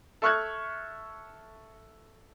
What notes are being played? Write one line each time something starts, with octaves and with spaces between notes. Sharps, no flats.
A4 E5 C#6 F6 F#6 G#6